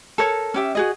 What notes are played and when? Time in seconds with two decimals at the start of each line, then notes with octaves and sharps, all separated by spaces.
0.18 A4 A#4 C#5
0.54 C#4 G4 E5
0.75 F#4 G#4 D#5